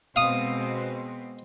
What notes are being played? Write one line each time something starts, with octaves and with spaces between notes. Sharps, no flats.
B2 G#3 C4 F5 D#6